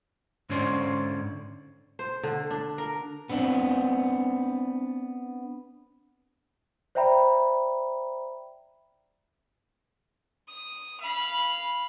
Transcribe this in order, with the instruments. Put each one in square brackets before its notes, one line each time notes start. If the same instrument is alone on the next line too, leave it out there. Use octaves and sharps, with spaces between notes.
[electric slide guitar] G#2 D3 C#4 C5 D5
[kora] C5
D3
D4
A#4
[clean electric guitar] B3 C4 D4
[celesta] C5 D5 E5 G5 A#5 B5
[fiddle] D#6
F5 B5